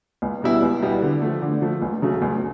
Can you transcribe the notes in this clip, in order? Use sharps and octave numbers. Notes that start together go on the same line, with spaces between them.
C#2
B2 G3 B3 E4
C#2
B2 G3 B3 E4
D3
F3 A3
D3
F3 A3
C#2
C#3 F#3 A3
C#2